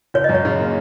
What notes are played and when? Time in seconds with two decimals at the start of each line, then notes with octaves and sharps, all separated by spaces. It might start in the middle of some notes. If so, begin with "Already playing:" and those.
0.14 F#1 C#5
0.24 D#5
0.29 F#2
0.34 C#5
0.45 C#3
0.60 A#3